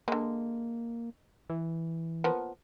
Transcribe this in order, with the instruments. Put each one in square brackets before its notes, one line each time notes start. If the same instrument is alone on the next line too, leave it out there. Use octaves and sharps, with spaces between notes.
[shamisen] D3 G#3 [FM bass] A#3
[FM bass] E3
[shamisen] F3 A#3 B3